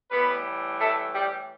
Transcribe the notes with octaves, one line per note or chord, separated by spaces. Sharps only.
A2 E3 G3 B3 B4
A3 A4
G3 G4